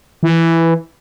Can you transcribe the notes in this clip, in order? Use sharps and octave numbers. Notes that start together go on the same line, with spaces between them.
E3